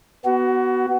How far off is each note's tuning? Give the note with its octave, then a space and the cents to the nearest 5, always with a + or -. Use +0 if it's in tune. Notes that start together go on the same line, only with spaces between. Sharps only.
B3 +0 F#4 +25